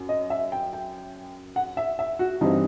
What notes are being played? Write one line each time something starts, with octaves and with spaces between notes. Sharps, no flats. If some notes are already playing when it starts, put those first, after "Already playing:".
Already playing: F#2
D#5
E5
G5
G5
F#5
E5
E5
F#4
G2 E3 G3 C4 D#4